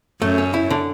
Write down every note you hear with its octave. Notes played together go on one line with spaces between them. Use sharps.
F#2 A3
C#4
E4
D3